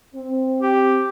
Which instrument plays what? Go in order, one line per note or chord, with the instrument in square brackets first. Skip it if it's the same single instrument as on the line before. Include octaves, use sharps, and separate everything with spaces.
[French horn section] C4
[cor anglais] G4